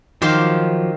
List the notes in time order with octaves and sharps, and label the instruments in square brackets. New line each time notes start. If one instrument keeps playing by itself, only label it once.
[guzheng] D#3 F4 C5 [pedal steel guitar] F3 F#3 D6